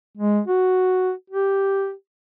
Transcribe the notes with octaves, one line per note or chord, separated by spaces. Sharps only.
G#3
F#4
G4